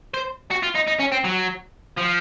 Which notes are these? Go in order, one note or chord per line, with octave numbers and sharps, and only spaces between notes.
C5
F#4
F4
D#4
D#4
C#4
C4
F#3
F3